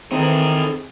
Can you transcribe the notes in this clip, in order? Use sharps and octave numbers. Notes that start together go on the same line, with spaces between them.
D#3 E3 C4 D#4 G#4 A4